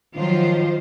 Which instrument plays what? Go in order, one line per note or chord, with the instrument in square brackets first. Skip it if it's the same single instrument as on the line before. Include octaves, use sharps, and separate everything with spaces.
[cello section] D#3 F3 F#3 F4 C5